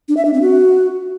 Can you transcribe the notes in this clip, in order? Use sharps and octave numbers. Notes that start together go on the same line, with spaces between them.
D4
E5
D4
C4
F#4